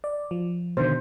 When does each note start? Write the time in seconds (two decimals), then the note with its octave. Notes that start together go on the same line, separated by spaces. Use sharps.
0.04 D5
0.31 F3
0.77 B2 D3 D#3 C5